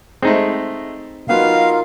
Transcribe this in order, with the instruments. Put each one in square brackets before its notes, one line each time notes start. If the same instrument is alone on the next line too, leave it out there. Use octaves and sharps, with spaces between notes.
[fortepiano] G#3 A3 [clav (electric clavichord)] C4 D#4
[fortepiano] F#3 B3 [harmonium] D#4 F4 A#4 [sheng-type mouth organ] F5